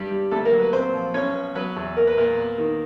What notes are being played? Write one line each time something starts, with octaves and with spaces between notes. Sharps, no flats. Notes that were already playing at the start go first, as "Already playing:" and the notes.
Already playing: G2 G3 G4
G3
D2 A3 A4
A#3 A#4
F#3
B3 B4
A#2 C4 C5
F3
B1 C#4 C#5
B3
F#3 B3 B4
E2
A#3 A#4
B4
A#2 A#3 A#4
B3
D#3